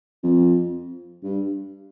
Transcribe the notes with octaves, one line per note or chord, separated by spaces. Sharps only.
F2
G2